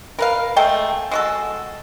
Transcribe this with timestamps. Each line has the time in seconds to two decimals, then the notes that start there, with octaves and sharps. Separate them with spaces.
0.19 A#4 B4 F5
0.56 G#3 A3 A4 G5
1.11 G#3 F#4 A4